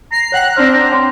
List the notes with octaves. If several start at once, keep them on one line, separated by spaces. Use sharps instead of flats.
A#5 C7
C#5 F#5 G5 F#6
C4 D4 C5 F6
A#5
C#5 G5 C6